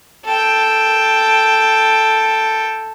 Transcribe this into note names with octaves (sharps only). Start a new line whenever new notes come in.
A4 G5